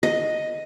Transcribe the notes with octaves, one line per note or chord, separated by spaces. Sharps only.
D#5